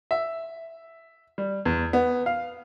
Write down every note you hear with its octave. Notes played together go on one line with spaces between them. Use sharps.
E5
G3
E2
B3
F5